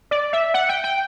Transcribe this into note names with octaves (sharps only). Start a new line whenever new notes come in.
D5
E5
F#5
G5
G5